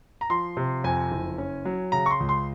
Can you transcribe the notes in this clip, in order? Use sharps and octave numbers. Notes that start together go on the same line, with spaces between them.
A#5
F3 C6
C3
F2 G#5
F#1
C#4
F#3
C#3 A#5
C#6
C6
C#2
C6